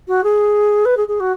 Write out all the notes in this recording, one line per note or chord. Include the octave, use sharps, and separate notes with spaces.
F#4
G#4
B4
G#4
G#4
F#4